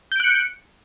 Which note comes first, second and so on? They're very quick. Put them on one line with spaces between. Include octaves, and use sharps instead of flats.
G6 D7 F#6 C#7